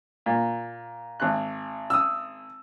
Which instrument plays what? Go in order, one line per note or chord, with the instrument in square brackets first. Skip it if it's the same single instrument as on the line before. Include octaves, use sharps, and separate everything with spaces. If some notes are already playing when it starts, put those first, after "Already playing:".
[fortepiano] A#2
G#1 F#6
[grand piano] D#6 E6